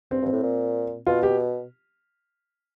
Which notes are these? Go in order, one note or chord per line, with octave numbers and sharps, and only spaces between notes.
G2 C4
G2 C4
A2
A#2
B2 F4
G4